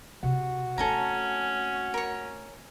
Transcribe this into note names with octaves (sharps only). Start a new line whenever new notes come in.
C3 D4 F#4
A3 C4 C#4 A4 G#5 A#5
A#4 C#5